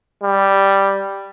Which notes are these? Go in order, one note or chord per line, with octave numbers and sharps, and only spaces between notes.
G3